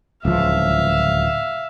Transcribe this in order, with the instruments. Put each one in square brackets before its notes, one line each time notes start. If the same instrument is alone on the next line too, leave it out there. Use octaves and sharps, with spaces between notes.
[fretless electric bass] D1 C#2 F3 [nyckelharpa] E5 F5